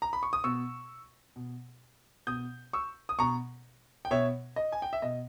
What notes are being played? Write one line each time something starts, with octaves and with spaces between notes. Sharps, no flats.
A#5
B5
C#6
D#6
B2 C#6 E6
B2
B2 D#6 G6
C#6 E6
D#6
B2 A#5 C#6
G5
B2 C#5 E5
D#5
G#5
G5
E5
B2 D#5